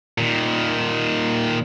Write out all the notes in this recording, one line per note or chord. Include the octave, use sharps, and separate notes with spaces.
A#2 D#3